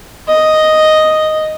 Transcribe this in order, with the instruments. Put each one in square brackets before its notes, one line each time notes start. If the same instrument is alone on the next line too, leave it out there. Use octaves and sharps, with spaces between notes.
[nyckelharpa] D#5